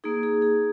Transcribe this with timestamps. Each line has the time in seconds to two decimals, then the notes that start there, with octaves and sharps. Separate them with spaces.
0.04 A#3 D#4 G#4
0.23 G#4
0.42 G#4